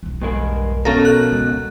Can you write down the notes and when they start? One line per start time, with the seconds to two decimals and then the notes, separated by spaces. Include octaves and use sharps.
0.03 B1 E2
0.22 G2 G#3 A#4
0.85 B2 F3 C#4 A4 A#4 F5
1.05 F#6
1.32 C#2